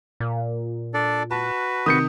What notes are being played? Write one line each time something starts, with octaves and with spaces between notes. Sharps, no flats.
A#2
D4 A4 D5
F#4 B4 A5
C3 D#3 D#6 G6 C#7